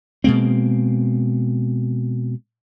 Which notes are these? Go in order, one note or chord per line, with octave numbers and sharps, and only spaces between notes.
B2 G#3 A#3 C4